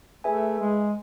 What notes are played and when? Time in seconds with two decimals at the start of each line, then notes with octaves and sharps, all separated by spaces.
0.24 A3 G#4 B4 E5 G#5
0.59 G#3